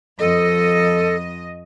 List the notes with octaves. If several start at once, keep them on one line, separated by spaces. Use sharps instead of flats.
F2 A4 D#5